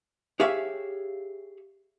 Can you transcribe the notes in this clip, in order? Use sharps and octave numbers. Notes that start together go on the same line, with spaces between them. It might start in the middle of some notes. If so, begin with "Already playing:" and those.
G4 G#4 C#5 E5 F5